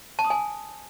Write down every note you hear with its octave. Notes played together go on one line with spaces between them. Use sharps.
A5
D#6
G#5